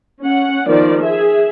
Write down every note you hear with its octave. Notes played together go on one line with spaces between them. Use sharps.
C#4 F#5
D#3 F3 B3 D5
G#4 E5